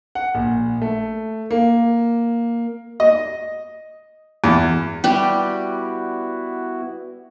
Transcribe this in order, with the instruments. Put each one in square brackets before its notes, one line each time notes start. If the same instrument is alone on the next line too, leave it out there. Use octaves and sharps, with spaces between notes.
[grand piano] F#5
A#1
A3
A#3
[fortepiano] D#5
E2
[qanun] G3 G4 [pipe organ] B3 E4 F#4